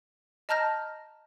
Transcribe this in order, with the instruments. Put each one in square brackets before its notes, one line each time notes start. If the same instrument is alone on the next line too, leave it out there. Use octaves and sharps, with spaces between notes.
[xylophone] D#5 A5 A#5 F6 G6 A#6